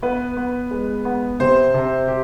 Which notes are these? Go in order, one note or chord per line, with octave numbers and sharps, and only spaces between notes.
B3 B4
B3
G#3
B3
C3 C5
C3
G4